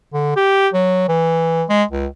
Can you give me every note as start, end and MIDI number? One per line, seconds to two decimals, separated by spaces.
0.14 0.32 50
0.36 0.68 67
0.73 1.07 54
1.08 1.64 52
1.69 1.84 56
1.91 2.07 37